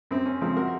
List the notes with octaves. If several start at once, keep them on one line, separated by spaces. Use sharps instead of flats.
F#2 C4
C#4
C#3 F3 G#3 C4
F#4 A#4